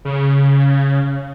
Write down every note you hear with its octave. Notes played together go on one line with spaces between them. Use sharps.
C#3